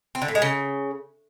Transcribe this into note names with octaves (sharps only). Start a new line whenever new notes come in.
C4
D3
A2
G#3
C#3